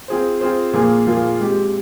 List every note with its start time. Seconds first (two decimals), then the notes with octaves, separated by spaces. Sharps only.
0.08 C4 F4 G#4 C5
0.41 C4 F4 G#4 C5
0.73 A#2 F3 A#3 F4 G#4
1.07 A#2 F3 A#3 F4 G#4
1.39 G#3 C4 G4